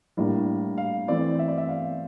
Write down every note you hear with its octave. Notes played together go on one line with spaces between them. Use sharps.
A2 G3 A#3 D4
F5
E3 A3 C4 D5
E5
D5
E5
F5